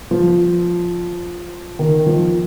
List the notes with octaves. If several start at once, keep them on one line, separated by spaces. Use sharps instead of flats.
F3
D#3
F3